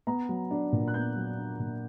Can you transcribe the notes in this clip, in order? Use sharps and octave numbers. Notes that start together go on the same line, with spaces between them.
B3 A#5
F#3
D4
A#2
F#6
B3 G6
F#3
D4
A#2